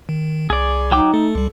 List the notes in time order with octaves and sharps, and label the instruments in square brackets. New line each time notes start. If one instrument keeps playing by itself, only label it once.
[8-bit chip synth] D#3
[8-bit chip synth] C2 [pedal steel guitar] G#4 D5
[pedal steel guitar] F#3 G5 D6 [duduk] D#4
[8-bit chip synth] A3 [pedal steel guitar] A4
[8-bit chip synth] C#2 G3